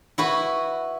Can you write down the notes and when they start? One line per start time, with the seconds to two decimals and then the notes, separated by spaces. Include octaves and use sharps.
0.18 E4 F#4 B4